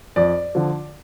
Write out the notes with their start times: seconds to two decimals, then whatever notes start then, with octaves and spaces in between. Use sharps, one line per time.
0.16 F2 D5
0.55 D3 F3